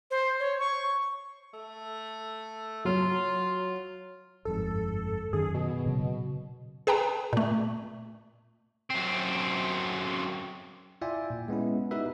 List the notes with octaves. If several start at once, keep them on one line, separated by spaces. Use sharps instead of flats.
C5
C#5
C#6
A3
F#3 F4
G1 F2 G#2 A4
F#2 D#3 C#4 G#4
B2
A#2 C#3 F#3
G#4 B4 G5 A5 A#5
A#2 A3
F#2 C4
E4 F4 D5 E5 G5 G#5
A#2
G#3 B3 C#4 E4
D#4 F#4 G4 A#4 B4 E5